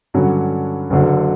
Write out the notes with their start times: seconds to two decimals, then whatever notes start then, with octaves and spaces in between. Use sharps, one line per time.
0.14 G2 D3 F#3 C#4
0.90 F#1 F#2 D3 F#3